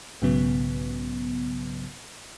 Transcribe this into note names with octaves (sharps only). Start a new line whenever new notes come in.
B1 G#2 C#3 F#3 B3